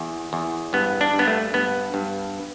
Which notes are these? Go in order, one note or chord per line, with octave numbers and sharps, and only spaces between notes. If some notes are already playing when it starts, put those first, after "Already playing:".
Already playing: E2
E2
G2 B3
D4
G2
B3
A3
G2 B3
G2